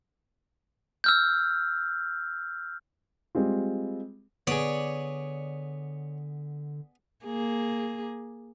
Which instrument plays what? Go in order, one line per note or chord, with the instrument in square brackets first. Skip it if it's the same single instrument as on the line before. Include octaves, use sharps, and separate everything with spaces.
[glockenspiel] E6 F6 G6
[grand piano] G3 G#3 C4 F4
[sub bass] D3 [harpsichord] B3 G#4 [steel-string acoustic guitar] C#5 [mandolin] D5
[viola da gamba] A#3 G#4